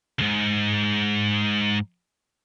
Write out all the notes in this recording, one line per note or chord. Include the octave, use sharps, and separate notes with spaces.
C#2 G#2